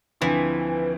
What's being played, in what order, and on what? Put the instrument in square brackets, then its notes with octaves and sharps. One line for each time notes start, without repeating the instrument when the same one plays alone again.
[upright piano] D2 D3 F3 C4 E4 [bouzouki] E3